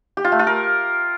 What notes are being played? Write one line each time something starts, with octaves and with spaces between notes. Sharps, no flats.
G4
F4
A3
F4
A#4